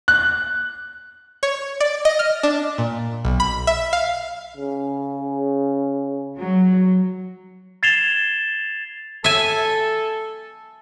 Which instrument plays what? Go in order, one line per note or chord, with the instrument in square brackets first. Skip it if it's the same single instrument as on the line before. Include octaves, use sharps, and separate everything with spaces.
[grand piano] F#6
[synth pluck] C#5
D5
D#5
F6
D4
A#2
B1
B5
E5
F5
[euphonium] C#3
[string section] F#3
[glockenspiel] G#6 A6 C7 E7 F7 G7
[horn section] A4 [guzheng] E5 G#5